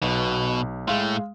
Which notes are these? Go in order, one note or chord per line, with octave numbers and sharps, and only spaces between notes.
B1 B2
A2 G#3 A3 F5 C6